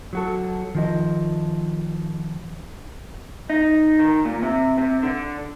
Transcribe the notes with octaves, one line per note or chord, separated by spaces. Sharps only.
F#3 F#4 A4
D#3 F3 D#5
D#4
D#3
A#2
C3
C3
D3